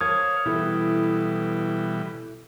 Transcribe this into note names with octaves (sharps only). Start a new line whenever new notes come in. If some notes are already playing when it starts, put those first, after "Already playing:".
A#4 C5 C#5 F5 A5 D#6 G#6
B2 E3 G3 E4 A4